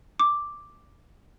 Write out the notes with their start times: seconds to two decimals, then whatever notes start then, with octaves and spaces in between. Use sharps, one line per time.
0.20 D6